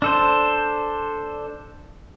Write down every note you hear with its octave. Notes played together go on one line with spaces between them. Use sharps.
D4 A4 C5